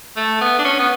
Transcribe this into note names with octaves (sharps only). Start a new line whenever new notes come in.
A3
B3
D4
C#4
B3